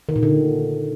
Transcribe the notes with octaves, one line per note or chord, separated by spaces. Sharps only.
D#3
A#2
D3